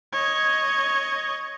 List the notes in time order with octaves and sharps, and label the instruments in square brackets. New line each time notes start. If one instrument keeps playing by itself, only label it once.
[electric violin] C#5 D#5